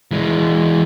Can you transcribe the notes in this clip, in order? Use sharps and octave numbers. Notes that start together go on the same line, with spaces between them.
E3 G#3